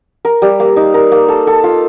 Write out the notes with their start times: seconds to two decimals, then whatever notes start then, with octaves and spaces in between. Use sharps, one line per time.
0.25 A#4
0.42 G3
0.60 A#3
0.76 D#4
0.94 A#4
1.12 A#3
1.28 A4
1.47 A4
1.64 F4